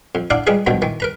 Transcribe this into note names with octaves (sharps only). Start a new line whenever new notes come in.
F2
D4 E4 D5 F5 F#5
G3 G#3 F4 G#4 B4
G2 B2 D#3 F3 F#3
D#3 E3
A#4 B4 A#5